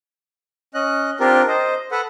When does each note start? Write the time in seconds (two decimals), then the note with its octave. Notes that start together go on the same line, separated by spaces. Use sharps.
0.74 C#4 D#5 F#6
1.20 C4 D4 F4 G4 A#4
1.48 C5 D#5
1.91 A4 B4 F#5